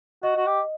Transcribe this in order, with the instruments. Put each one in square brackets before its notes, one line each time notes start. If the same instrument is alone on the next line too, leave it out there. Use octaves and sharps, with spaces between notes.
[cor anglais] F#4 [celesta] D#5
[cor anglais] F#4
G4